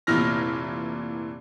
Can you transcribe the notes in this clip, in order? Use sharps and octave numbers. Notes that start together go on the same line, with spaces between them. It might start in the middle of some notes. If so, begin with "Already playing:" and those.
F1 A#2 E3 F6 A#6